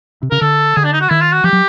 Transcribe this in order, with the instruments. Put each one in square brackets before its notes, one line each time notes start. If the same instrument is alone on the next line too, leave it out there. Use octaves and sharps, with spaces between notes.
[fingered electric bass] C3
[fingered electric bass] C#3 [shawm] A#4
[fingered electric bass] D3 [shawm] A4
[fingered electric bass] D3 [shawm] G#4
[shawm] D4
D#4
F#4
[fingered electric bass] D#3 [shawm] E4
[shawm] F4
F#4
[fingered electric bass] F3 [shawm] G4
[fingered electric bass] F#3